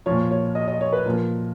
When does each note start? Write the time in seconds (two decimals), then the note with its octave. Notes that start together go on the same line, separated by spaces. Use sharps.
0.06 A#2 F3 C#5
0.31 C#5
0.55 D#5
0.68 D#5
0.81 C#5
0.93 B4
1.06 A#2 F3 A#4